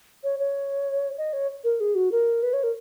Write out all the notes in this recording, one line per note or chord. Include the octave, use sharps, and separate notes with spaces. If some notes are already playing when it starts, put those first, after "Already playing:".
C#5
C#5
D#5
C#5
A#4
G#4
F#4
A#4
B4
C#5
A#4